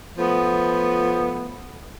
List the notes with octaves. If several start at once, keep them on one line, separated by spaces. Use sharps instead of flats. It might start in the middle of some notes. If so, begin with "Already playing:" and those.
F3 A3 B3